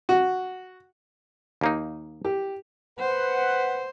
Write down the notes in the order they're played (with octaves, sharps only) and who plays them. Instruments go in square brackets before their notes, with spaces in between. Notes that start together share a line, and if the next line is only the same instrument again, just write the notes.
[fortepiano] F#4
[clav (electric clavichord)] D#2 A#3 D#4
[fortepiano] G4
[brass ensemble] B4 F#5 [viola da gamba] C5